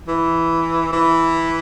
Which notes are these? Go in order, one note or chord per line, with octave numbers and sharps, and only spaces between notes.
E3
E3